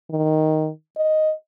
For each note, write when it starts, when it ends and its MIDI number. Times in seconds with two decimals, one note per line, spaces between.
0.10 0.69 51
0.97 1.33 75